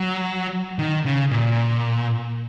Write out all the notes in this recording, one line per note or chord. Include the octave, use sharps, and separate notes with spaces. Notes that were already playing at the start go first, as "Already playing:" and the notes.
Already playing: F#3
D#3
C#3
A#2